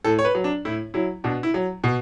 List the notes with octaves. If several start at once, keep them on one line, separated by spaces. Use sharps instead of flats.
A2 A4
C#5
B4
F#3
D4
A2 E4
F#3 E4
B2 D4
E4
F#3
B2